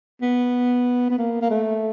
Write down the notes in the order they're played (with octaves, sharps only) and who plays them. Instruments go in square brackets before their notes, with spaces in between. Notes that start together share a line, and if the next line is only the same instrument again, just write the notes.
[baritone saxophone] B3
B3
A#3
A#3
A3